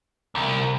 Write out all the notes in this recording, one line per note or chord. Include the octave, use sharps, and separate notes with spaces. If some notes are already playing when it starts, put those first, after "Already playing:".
C2